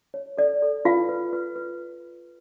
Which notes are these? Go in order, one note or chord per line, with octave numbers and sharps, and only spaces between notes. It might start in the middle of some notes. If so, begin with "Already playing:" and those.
C#5
A4 D5
A4
F4 B4 F5
B4
B4
B4